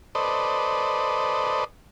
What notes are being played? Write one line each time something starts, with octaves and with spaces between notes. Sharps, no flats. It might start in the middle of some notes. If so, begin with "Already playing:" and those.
A4 B4 C5 D5 D#5